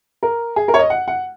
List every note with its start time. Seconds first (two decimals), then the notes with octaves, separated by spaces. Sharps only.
0.23 A#4
0.56 G#4
0.68 A#4
0.74 C#5
0.79 D#5
0.90 F#5
1.08 F#5